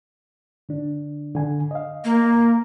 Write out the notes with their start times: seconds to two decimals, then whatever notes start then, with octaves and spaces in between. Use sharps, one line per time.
0.69 D3 D4
1.35 D3 G#5
1.71 D#5 F5
2.05 A#3